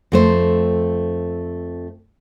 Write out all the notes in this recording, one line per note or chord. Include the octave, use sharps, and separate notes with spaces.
F2 A3 C5